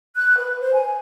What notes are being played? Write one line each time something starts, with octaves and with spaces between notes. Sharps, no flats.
F#6
B4
C5
G#5